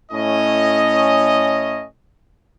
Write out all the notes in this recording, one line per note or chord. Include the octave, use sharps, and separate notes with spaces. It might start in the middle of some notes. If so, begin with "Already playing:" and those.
A2 C#4 D#5